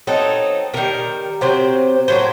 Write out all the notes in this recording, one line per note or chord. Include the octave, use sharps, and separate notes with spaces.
F#3 C4 D#4 A4
C3 D#3 G3 A#4
C3 F#3 C4 C5
A2 F#3 A#3 C5